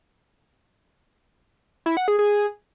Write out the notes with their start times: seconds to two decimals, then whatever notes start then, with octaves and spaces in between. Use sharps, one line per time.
1.86 E4
1.97 F#5
2.08 G#4
2.19 G#4